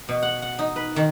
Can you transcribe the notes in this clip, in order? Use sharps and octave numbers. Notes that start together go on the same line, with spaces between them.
B2
F#5
F#5
D#4
B4
D#3